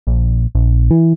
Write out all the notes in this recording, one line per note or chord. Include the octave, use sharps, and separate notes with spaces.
A#1
A#1
E3